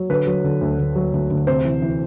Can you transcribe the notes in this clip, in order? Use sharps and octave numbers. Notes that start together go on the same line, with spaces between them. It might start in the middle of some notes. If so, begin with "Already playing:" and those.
Already playing: F#3
D3 B4
F#3
D3
D2
D2
F#3
D2
D2
C3 C5
E3
E3